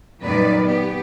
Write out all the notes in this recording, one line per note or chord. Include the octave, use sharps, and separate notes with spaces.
F#2 A#2 D#3 G3 B4 D5
B3 G4